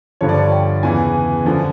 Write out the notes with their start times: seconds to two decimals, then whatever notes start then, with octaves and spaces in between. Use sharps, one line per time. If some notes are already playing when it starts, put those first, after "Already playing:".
0.21 G2 D3 F3 C#5
0.29 D5
0.36 C#5
0.52 G5
0.83 E2 C#3 E3 G#5
1.45 F#2 D3 F3